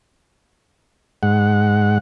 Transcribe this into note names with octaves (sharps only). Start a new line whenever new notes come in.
G#2 F#5